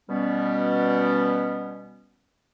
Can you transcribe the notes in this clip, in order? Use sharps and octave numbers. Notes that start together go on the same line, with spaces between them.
B2 G3 B3 C#4